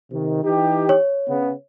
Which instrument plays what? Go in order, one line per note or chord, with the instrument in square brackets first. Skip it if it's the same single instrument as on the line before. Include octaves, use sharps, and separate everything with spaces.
[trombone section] C3 D#3
E3 D#4 G4
[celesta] C#5
[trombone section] C#3 B3